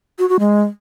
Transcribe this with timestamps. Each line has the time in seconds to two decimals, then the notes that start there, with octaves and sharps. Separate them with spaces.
0.19 F#4
0.29 F#4
0.39 G#3